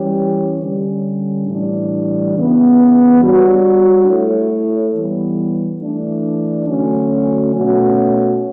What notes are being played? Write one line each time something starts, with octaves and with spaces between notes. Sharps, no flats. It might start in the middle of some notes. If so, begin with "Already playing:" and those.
Already playing: E3 G3 C#4 G4 C#5
D3 G3 C#4
A2 E3 G3 D4
C#3 E3 B3
G3 D4 F#4 C#5
A3 E4 A4 C#5
E3 G3 B3
E3 A3 D4
D3 F#3 A3 C#4 F#4
B2 A3 C#4 F#4 C#5